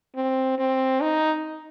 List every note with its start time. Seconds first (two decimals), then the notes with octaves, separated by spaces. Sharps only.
0.16 C4
0.59 C4
1.02 D#4